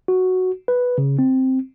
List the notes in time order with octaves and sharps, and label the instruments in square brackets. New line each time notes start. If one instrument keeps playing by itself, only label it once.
[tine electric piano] F#4
B4
C#3
C4